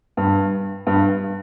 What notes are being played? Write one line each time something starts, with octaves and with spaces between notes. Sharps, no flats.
G2
G2